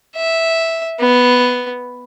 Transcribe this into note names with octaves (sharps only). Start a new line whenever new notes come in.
E5
B3